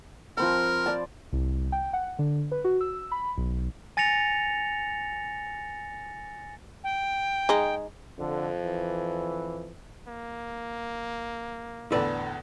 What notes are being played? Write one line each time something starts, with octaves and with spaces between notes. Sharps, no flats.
F3 C4 A#4 B5
D5 A5
C2
G5
F#5
D3
B4
F#4
E6
B5
B1
G#5 A6 A#6 C#7 F7
G5
G#3 D#4
F2 D3
E3
A#3
E2 A2 D3 A4 B4 D5